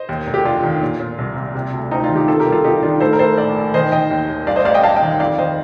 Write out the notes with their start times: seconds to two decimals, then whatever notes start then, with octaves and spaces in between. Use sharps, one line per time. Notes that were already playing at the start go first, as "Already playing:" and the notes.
Already playing: C5 D#5
0.09 D#2
0.26 F1
0.34 G4
0.45 F1 D4 F4
0.63 D#3
0.81 A#2
1.00 A#2
1.18 C2
1.36 C2
1.55 C3
1.73 D2
1.91 D2 C4 D#4
2.03 D4 F4
2.09 D#3
2.15 D#4 G4
2.28 C3 F4 A4
2.40 G4 A#4
2.46 C2
2.52 F4 A4
2.64 C2 D#4 G4
2.82 D#3 D4 F4
3.00 A2 A4 C5
3.13 A#4
3.19 A2 A4 C5
3.37 A#1 A#4 D5
3.56 A#1
3.74 D#3 C5 D#5
3.92 D#3 D#5 G5
4.11 D#2
4.29 D#2
4.47 G2 D5 F5
4.56 C5 D#5
4.65 A1 D5 F5
4.74 D#5 G5
4.83 A1 F5 A5
4.95 D#5 G5
5.02 D#3
5.20 F2 D5 F5
5.38 D#3 C5 D#5